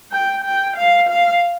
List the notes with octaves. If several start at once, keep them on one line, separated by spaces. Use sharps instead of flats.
G5
G5
F5
F5